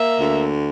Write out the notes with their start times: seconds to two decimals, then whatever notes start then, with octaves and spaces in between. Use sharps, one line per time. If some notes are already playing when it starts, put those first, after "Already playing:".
Already playing: A#3 E5
0.19 D2